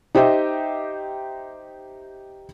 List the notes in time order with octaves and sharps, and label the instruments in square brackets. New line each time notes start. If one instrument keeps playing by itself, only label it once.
[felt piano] D#4 G4 C5 D#5 E5